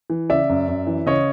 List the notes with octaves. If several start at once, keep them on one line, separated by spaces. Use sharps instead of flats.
E3
C#3 D5 E5
F#2
F#2
E3
C#3 C#5 D#5